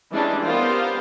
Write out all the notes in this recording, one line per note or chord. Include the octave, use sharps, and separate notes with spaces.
E3 G3 G#3 C#4 D4
B3 F4 G4 A#4 C5 F5